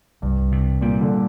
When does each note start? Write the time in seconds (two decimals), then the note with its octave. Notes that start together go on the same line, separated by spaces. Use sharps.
0.22 C2 G2
0.52 C3
0.81 A#2 G3
1.01 D3